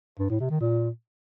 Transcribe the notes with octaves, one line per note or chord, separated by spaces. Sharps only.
G2
A2
C3
D#3
A#2